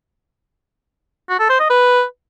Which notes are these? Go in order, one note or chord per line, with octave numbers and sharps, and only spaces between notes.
F#4
A4
C5
D#5
B4